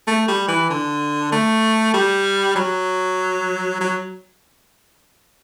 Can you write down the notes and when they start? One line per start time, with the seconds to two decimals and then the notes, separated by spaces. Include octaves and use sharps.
0.07 A3
0.28 G3
0.48 E3
0.70 D3
1.32 A3
1.94 G3
2.56 F#3
3.80 F#3